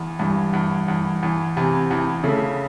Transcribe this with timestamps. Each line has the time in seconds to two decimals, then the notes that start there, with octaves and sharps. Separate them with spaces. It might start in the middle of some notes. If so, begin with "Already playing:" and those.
Already playing: E2
0.19 E2 G2
0.53 E2
0.88 E2
1.23 E2
1.57 E2 C3
1.91 E2
2.24 C#3 A3